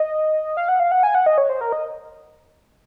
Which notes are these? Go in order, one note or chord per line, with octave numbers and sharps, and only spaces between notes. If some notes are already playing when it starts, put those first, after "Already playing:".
Already playing: D#5
F5
F#5
F5
F#5
G#5
F#5
D#5
C#5
C5
A#4
D#5